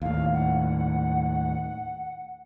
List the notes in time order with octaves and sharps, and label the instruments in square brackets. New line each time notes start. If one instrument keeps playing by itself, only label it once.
[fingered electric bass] D#2 A2 [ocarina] F5
[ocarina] F#5